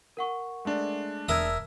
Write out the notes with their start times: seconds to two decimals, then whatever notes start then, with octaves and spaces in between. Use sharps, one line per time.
0.17 A#4 F#5 C#6
0.65 G#3 A3 D4
1.28 E1 A#4 E5 A5 D#6 E6 G#6